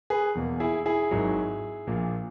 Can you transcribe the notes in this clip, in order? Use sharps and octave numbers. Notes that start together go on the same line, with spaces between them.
G#4 B4
E2 B2 A#3
E4 G#4
E4 G#4
G#1 G#2 D#3 F#3
A#1 A#2 A#3